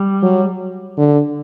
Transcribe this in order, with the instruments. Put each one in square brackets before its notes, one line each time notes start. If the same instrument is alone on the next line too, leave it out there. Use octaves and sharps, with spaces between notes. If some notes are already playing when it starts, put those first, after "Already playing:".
Already playing: [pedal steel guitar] G3
[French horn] F#3
D3